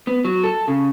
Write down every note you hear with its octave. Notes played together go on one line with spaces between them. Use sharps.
B3
F#3
A4
C#3